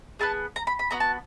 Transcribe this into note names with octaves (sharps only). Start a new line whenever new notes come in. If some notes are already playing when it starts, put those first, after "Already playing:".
B3 E4 G#4 A5
A#5
B5
B5
B3 D#4 F#4 A#5
A5